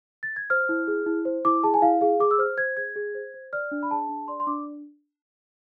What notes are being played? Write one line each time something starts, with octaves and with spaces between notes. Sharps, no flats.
A6
G#6
C5 F6
E4
G#4
E4
C5
E4 D6
G#4 A5
G#5
E4 F5
G#4 F5
G#4 D6
E6
C5 F6
C5 G#6
G#4 G#6
G#4
C5
C5
D5 F6
D4
B5
G#4 A5
D4
D5 C6
C6
D4 D6